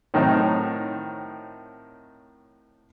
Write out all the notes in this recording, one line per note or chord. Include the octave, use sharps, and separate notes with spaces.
A2 D#3 F#3 C4 D#4